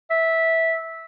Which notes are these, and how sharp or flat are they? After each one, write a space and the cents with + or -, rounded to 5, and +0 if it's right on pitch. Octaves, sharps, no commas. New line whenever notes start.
E5 -10